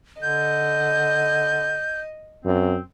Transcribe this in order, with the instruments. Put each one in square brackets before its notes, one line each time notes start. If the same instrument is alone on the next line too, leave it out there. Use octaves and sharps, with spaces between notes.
[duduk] D3 [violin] D#5 [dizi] G6
[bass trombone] F#2 [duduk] C4